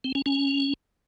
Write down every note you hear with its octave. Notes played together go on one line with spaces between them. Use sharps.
C4
C#4
C#4